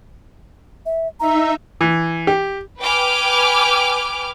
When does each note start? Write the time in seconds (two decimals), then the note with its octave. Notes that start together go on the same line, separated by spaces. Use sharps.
0.86 E5
1.20 D#4 E5 A#5
1.81 E3
2.27 G4
2.80 B4 G5 G#5 D6 F6